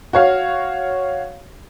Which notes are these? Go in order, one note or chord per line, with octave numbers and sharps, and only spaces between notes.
F#4 C#5 F5